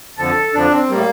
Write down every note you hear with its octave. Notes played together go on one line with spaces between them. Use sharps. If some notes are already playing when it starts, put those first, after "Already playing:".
F2 D3 F3 A4
F2 D3 F3 D4
C4
A2 G3 A#3